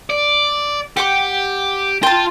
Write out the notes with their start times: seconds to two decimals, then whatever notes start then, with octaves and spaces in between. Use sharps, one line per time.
0.10 D5
0.97 G4 F#5 G5 D6
2.03 F4 G5 A5 C6